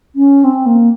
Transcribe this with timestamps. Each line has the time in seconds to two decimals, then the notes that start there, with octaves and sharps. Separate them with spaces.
0.16 C#4
0.44 C4
0.66 A#3